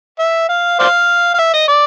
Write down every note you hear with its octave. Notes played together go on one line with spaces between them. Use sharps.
E5
F5
C5 D5 F5
F5
E5
D#5
D5